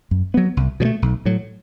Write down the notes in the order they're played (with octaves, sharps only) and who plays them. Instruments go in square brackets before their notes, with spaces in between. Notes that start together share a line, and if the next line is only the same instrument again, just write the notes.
[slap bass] F#2
F#3 B3
C2
B2 F#3
A3
B1
A2 F#3